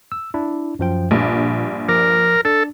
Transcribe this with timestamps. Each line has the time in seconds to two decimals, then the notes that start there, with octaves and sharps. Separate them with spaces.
0.12 E6
0.34 D4 E4
0.79 F#2 F3 G5
1.11 A#1 G2 A#2
1.89 F3 A#4 D6
2.45 D4 A4